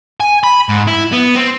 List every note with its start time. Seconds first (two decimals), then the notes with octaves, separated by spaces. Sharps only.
0.20 G#5
0.44 B5
0.69 G#2
0.87 E4
1.12 B3
1.36 C4